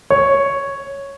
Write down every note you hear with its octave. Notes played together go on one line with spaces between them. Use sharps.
C#5